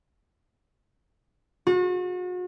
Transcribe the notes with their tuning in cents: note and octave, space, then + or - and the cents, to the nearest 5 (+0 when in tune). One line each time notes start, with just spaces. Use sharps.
F#4 -40